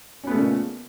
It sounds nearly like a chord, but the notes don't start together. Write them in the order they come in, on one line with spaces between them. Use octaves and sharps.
C#4 B3 A3 C#3 A#2